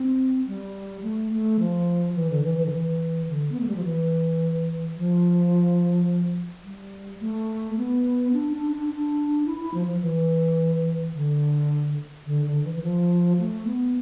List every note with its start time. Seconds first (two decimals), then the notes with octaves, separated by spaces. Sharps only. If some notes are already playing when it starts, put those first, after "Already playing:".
Already playing: C4
0.47 G3
1.03 A3
1.32 A3
1.59 F3
2.15 E3
2.30 D3
2.43 E3
2.57 E3
2.66 D3
2.72 E3
3.28 D3
3.52 B3
3.60 A3
3.68 G3
3.76 F3
3.84 E3
4.97 F3
6.65 G3
7.20 A3
7.77 B3
8.33 D4
8.52 D4
8.71 D4
8.89 D4
9.46 E4
9.60 E4
9.74 F3
9.87 F3
10.01 E3
11.14 D3
12.26 D3
12.46 D3
12.64 E3
12.75 E3
12.82 F3
13.39 A3
13.66 B3